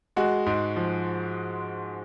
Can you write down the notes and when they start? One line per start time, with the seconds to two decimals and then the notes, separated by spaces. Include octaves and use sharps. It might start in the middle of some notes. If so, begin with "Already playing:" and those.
0.16 G#3 F#4
0.46 G#2
0.76 F3